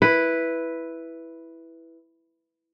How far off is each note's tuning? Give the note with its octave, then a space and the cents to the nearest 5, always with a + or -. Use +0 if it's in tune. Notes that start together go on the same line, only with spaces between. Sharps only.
E4 +0 B4 +0